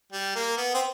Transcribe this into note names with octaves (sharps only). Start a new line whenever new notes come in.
G3
A#3
B3
C4